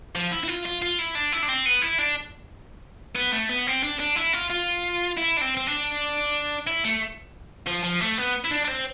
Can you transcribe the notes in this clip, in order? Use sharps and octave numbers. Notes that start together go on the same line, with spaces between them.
F3
E4
E4
F4
F4
F4
E4
D4
E4
D4
C4
B3
E4
D4
B3
A3
B3
C4
D4
D4
E4
F4
F4
E4
D4
C4
C4
D4
E4
A3
F3
F3
A3
B3
E4
D4
D4
C4